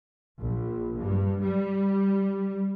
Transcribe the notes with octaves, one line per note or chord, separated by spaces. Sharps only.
A#1
G2
G3